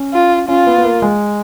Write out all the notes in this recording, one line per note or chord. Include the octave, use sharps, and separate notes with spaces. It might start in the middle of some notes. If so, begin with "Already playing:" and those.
Already playing: C#4
F4
C#4 F4
B3
B3
A#3
G#3